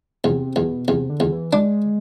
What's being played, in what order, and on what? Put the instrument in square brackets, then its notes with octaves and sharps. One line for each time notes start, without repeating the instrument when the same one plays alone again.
[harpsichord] E2 [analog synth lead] C3
[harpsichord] E2 [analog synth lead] B2
[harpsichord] E2 [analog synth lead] C3
[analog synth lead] D3
[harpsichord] E2
[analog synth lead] E3
[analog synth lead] G#3 [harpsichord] D4